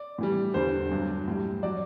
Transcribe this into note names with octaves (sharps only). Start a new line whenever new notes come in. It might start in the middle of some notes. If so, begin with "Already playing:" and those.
Already playing: D5
A2 E3 G3
E2 D3 G3 C5
G2 F#3
A2 G3
F#3 D5